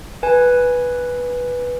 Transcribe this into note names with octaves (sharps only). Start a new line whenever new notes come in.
B4 G#5